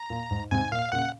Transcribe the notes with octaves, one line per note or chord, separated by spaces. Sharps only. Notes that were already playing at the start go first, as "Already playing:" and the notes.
Already playing: A#5
A#2
G#2
G#2 C3 G#5
A#2 F5
A#2 C#3 F#5